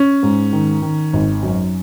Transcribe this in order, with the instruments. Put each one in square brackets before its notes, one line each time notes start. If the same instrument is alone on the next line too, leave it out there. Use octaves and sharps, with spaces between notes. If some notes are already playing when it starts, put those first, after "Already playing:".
Already playing: [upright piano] C#4
[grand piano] G#2
D#3
D#3
G#1
F#2